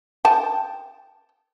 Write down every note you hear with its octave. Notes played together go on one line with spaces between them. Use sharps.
G5 A5